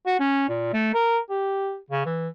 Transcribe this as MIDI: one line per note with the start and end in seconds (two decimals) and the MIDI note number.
0.06 0.18 66
0.19 0.48 61
0.49 0.68 46
0.73 0.90 57
0.94 1.18 70
1.30 1.76 67
1.90 2.05 49
2.06 2.28 52